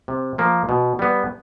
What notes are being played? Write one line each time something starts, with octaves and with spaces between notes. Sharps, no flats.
C3
F3 A#3
B2
G3 B3